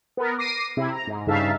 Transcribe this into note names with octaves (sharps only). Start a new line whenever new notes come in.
B3 A#4
D6 A#6 C7 D#7
C3 E4
A#5
G#2
G2 C#3 D#4 E5 F5 A5